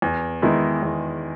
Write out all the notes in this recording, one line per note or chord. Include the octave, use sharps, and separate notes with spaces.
E2
D#3 G#3 B3 E4
E2